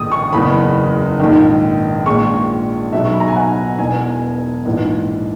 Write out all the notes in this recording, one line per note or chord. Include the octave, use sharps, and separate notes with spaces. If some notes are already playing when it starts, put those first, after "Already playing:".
Already playing: A#1 G#2 D#3 G#3 D#6
C#6
F#1 E2 C#3 B5
A#1 G#2 D#3
A#1 A#2 G#3 C#6
B1 B2 F#3 E5
C#6
B5
A#5
G#5
F#5
E1 E2 B2 G#5
A#1 G#2 E3